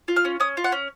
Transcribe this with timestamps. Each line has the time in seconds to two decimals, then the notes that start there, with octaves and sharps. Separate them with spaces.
0.08 F4
0.16 F6
0.25 C#4
0.40 C#4 D#6
0.57 F4
0.64 F#5
0.72 C#4